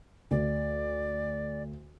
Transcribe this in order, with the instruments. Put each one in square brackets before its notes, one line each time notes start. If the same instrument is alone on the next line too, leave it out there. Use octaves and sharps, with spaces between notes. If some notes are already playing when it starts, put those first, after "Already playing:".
[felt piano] D2 [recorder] D5